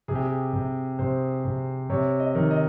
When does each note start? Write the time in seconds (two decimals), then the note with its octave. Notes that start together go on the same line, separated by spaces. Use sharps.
0.08 C3 G#4
0.15 G4
0.23 G#4
0.53 C3
0.99 C3 C5
1.45 C3
1.90 C3 C#5
2.20 D#5
2.35 D#3
2.51 D#5